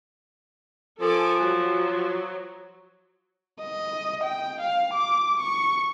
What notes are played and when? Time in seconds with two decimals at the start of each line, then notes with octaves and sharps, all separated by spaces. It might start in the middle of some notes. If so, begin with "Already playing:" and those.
1.01 F3 A4 G#5 D6
1.41 F#3
3.61 D#5
4.24 G5
4.61 F5
4.94 D6
5.40 C#6